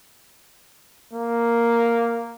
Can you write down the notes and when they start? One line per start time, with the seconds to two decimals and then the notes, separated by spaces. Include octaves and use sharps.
1.13 A#3